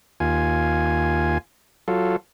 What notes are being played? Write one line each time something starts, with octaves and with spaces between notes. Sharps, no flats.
D#2 F4 G#5
F#3 F4 A4